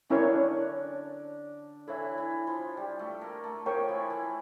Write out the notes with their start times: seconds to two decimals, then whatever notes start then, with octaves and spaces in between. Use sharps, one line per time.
0.10 D3 C#4 D4 E4 A#4 C#5
1.87 E3 E4 A4 C#5 E5
2.17 E3 E4
2.47 F3 F4
2.77 G3 G4
2.99 A3 A4
3.21 A#3 A#4
3.44 A3 A4
3.66 F3 F4 A#4 C#5 G5 C#6
3.88 E3 E4
4.10 E3 E4